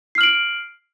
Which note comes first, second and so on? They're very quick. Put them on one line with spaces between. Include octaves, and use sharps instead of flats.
C7 F6 F#7 D7